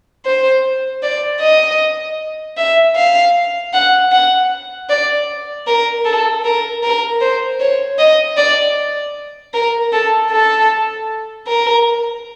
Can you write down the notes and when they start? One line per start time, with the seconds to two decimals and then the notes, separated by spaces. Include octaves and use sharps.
0.25 C5
1.03 D5
1.41 D#5
2.57 E5
2.96 F5
3.73 F#5
4.12 F#5
4.89 D5
5.67 A#4
6.05 A4
6.45 A#4
6.83 A#4
7.21 C5
7.60 C#5
7.99 D#5
8.37 D5
9.54 A#4
9.93 A4
10.31 A4
11.47 A#4